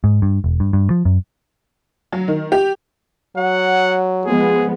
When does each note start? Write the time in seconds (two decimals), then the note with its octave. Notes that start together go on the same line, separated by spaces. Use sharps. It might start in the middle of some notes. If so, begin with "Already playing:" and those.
0.04 G#2
0.22 G2
0.44 E1
0.60 G2
0.73 G2
0.90 F3
1.05 F#2
2.13 F#3
2.28 D#3
2.52 G4
3.37 F#3 F#5
4.25 F3 G#3 B3 G#4